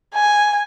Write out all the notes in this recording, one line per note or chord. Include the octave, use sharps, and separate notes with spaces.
G#5